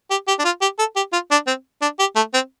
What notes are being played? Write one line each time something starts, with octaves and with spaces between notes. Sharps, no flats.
G4
G4
D4
F4
G4
A4
G4
F4
D4
C4
D4
G4
A3
C4